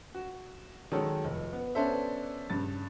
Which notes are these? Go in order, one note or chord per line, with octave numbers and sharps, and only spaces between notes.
F#4
D#3 F#3 G#3 A4 C#5
F1
B3
B3 C#4 D4 A4 C5 E5
G2 C#3 A6